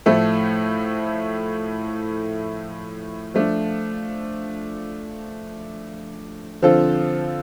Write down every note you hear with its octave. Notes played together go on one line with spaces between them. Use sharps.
A2 F3 A3 E4 A4
F3 A3 D4
D3 F3 C4 F4 A4